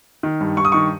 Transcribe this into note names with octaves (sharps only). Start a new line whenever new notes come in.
D#3
G2
G2 C#6
D#6
D#3 C#6